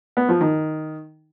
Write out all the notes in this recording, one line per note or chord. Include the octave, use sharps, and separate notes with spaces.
B3
F3
D#3